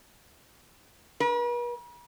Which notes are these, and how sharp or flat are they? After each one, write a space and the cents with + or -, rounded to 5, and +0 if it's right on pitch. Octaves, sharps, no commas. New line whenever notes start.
B4 -45